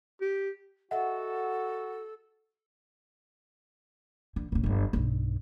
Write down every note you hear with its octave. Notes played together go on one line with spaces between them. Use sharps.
G4
F#4 A4 D#5 E5 F#5
D3
D#1 C#3
G1 F#3
B1 G2